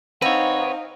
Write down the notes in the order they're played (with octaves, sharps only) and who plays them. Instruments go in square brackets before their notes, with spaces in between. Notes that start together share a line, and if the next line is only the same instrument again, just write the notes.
[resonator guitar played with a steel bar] C4 [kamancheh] D#4 F5 [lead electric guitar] B4 C#5 [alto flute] F#5